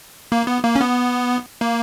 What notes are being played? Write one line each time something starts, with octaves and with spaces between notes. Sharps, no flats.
A#3
B3
A#3
C#4
B3
A#3